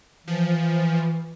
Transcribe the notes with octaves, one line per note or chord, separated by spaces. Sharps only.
E3 F3